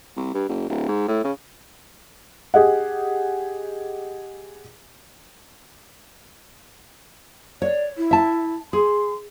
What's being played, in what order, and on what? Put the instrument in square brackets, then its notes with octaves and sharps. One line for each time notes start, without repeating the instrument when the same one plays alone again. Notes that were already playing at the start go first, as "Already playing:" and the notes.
[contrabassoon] C2
G2
F#1
D1
G#2
A2
C#3
[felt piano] G4 G#4 D#5 F#5
[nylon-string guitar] C#5 [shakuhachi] D5
[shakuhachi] E4
[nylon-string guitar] E5 A5
[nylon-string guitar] G#4 [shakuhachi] C6